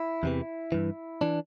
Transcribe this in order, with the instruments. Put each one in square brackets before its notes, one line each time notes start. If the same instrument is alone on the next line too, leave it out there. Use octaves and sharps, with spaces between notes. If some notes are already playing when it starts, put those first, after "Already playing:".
Already playing: [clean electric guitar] E4
E2 C3 E3
G2 E3
E3 D4